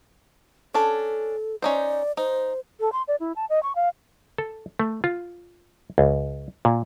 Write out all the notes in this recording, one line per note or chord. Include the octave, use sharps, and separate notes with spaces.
C#4 D4 A4 A5
C#4 D#4 C5 D5
D#4 C5
A4
C6
D5
E4
A5
D#5
C#6
F5
A4
A3
F4
C#2
A#2